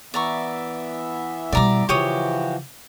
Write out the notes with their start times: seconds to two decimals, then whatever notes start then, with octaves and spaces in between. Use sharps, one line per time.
0.14 E3 B3 D5 E5 A#5 C#6
1.52 B2 G3 D5 A#5 D6
1.89 C#3 E3 F3 F#4 G4 C#5 D#6